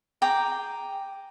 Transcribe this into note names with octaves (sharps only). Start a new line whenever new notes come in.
G#4 G5 A#5 D6